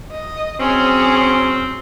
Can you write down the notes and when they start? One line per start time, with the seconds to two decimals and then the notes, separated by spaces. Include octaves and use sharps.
0.11 D#5
0.59 F#3 C4 C#4 G#4